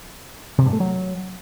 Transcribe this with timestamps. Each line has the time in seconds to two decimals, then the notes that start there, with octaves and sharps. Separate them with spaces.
0.58 C3
0.66 G2
0.73 A3
0.80 F#3